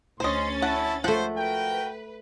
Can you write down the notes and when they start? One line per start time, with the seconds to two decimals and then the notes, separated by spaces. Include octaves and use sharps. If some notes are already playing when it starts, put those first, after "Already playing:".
0.20 D2 C#4 C5 D#5 C6 A6
0.62 E4 F#5 A5
1.04 F3 A3 C5 F#5
1.37 F#4 A#4 B4 G5